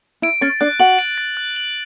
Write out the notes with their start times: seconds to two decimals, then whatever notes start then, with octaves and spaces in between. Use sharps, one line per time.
0.22 E4 D7
0.41 C#4 C#5 A6
0.61 D4 D5 F#6
0.79 F#4 F#5 F#7
0.99 D7
1.18 A6
1.37 F#6
1.56 F#7